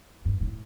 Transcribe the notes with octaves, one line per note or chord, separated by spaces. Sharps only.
G2
A2